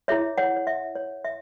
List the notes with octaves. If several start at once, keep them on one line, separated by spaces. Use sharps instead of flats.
E4 G#4 C#5 E5
C#5 F#5
C#5
E5
C#5
E5